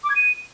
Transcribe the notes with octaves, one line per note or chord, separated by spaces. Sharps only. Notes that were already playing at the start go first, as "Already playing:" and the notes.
D6
G#6
D#7